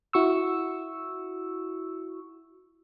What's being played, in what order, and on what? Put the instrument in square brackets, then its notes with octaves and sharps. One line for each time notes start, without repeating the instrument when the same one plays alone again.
[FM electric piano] E4 F#4 C#6 E6